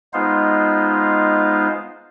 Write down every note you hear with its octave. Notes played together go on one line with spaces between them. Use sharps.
G#3 B3 D#4 F4 C5 F5